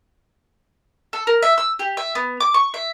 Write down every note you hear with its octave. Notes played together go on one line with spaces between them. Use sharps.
A4
A#4
E5
E6
G4
E5
B3
D6
C#6
E5